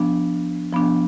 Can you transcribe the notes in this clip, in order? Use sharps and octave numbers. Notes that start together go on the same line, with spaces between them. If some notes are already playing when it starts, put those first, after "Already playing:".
Already playing: F3 B3 D4
F3 B3 D4